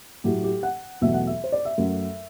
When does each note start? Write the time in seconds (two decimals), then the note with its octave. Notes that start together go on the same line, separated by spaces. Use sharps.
0.24 A2 F#3 A3 G4
0.43 G4
0.63 F#5
1.01 E2 B2 F#3 A3 E5
1.14 F#5
1.27 E5
1.44 C5
1.52 D5
1.65 E5
1.78 F#2 F#3 A3